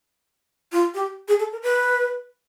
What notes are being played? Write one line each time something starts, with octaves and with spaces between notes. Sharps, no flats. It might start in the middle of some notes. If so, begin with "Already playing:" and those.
F4
G4
G#4
A4
A#4
B4